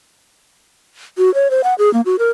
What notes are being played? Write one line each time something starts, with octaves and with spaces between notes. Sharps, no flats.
F#4
C#5
C5
F#5
G#4
A#3
F#4
A#4